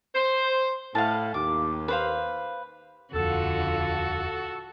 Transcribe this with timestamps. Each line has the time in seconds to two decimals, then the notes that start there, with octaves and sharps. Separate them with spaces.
0.15 C5
0.95 A2 F5 A5
1.34 D#2 D6
1.88 B4 C5 F5
3.14 D#1 F2 D3 F4 F#4 A4